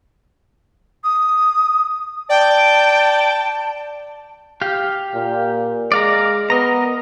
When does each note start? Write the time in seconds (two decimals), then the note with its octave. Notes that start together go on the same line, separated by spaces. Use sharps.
1.04 D#6
2.30 D5 G5 A5
4.61 G4 F5
5.15 A#2
5.92 G#3 D5 F5 A#5
6.50 B3 A#4 D#5 A#5